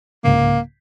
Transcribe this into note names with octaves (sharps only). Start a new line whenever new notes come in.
C2 G#2 C#3 A#3